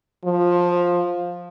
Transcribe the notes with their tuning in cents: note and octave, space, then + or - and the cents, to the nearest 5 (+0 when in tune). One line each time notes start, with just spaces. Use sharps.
F3 +10